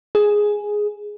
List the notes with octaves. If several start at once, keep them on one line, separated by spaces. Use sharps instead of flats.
G#4